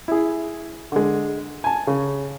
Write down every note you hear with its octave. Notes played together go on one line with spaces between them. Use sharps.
E4 G#4
D3 G#3
G#5 A5
C#3